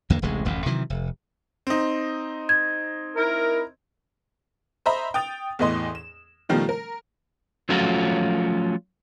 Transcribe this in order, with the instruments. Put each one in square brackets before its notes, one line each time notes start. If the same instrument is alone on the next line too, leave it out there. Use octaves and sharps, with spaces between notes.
[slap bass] E2 D3 A#3
D1 A1 C3 G#3
D1 A1 F#2
C3 D#3 E3 F#3
F1
[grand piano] C4 D#4
[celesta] G#6
[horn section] E4 A#4
[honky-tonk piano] C5 D#5 E5 A#5 B5
G5 D#6 A6 F7
E2 A2 E3 D#5 C6
E7
B2 D#3 F3 G3 A3
A#4
[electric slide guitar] F3 F#3 A3 C#4 F4 F#4